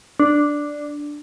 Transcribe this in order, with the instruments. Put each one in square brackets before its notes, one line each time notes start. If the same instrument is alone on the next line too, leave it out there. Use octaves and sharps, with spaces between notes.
[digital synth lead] D4